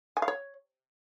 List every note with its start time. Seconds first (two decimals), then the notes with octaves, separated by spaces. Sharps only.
0.17 G#5
0.22 F5
0.28 C#5